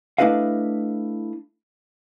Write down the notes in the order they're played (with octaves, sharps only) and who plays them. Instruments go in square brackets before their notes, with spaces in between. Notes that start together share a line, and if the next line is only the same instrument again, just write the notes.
[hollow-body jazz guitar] A3 D4 E4 B4 D#5 F5